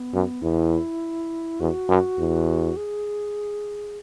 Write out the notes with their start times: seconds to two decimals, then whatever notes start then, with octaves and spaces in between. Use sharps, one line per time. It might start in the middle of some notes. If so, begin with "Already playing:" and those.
Already playing: B3
0.14 F#2
0.42 E2 E4
1.60 E2 F#4
1.89 F#2
2.18 E2
2.77 G#4